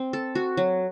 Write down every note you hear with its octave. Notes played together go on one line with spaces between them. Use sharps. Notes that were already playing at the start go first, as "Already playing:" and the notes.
Already playing: C4
A4
F#4
F#3